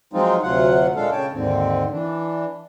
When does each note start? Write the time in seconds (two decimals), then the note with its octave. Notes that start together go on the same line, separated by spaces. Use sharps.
0.13 F3 F#3 G#3 C4 D#4 F4
0.42 D2 C3 F#3 F4 F#5
0.96 A#2 G#3 D4 A4 F5
1.12 C#3 C#5 G5 A5
1.33 D#2 G#2 D3 C4
1.91 E3 D4